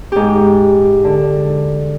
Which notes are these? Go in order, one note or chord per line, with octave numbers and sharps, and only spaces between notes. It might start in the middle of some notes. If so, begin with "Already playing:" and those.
G#2 G4
D3